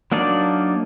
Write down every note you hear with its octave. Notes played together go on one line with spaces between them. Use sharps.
F#3 A#3 D4 D#4 D5